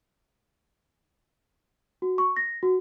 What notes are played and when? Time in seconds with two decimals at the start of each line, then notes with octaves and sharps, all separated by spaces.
2.02 F#4
2.18 C#6
2.37 A#6
2.63 F#4